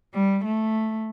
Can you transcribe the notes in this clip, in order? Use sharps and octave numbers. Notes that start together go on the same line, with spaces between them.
G3
A3